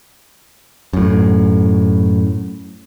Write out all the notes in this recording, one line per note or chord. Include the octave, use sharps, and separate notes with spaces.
F#2 A2